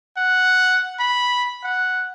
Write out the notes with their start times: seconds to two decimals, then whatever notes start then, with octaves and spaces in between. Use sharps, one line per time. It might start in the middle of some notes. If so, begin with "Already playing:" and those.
0.17 F#5
0.99 B5
1.64 F#5